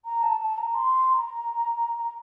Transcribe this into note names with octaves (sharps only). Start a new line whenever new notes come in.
A#5
A5
A5
A#5
C6
C6
A#5